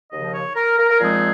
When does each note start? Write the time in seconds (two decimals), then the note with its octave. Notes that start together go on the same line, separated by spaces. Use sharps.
0.11 D#2 C#3 F3 D#5
0.34 C#5
0.56 A#4
0.78 A#4
0.89 A#4
1.00 A#2 F3 G#3 C4 D#4 G#4